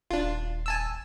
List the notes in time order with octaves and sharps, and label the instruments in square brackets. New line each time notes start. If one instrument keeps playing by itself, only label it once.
[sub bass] D#1 [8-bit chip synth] D4 F4
[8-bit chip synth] G#5 A5 E6